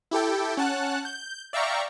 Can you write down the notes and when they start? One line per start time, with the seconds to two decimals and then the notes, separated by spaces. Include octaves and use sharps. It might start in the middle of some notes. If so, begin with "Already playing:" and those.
0.11 E4 G4 A4 G5
0.57 C#4 F#5 A5 F#6
1.05 G6
1.53 D5 E5 F5 G5 A#5 C#6